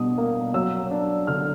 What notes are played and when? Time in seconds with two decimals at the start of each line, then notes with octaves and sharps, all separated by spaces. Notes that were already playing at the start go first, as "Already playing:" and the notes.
Already playing: B2 G3 D4 D#6
0.18 A#3
0.54 F#3 E6
0.91 D4
1.27 D3 F6